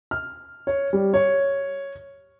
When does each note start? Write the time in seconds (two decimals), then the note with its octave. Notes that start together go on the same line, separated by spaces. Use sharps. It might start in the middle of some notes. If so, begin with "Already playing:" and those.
0.11 F6
0.67 C#5
0.93 G3
1.14 C#5